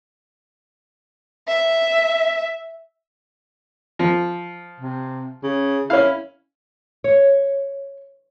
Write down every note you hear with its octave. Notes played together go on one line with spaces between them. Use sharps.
E5
F3
C3
C#3
C#4 E4 F5
C#5